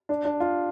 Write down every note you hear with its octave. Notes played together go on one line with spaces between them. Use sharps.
D4
D4
F4